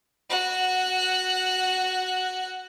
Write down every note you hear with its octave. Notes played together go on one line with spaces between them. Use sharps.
F#4 F#5